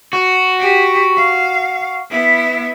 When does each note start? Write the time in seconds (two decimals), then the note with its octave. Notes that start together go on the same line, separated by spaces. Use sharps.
0.13 F#4
0.60 G4
1.17 F5
2.11 B3 E4